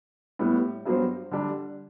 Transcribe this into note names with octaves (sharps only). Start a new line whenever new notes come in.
A2 G3 B3
G2 F#3 B3 F#4 C5
D3 G3 D4